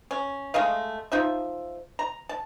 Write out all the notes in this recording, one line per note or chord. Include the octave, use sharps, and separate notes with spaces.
C#4
G#3 A3 D#5 F5
F3 D#4 E5
A#5
A5